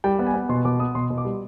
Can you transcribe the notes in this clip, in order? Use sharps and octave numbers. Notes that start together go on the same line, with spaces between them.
G3 G5
B3
G#5
B3
B2 C6
B2 D6
B3 D#6
B2 C6
B2
D6
G3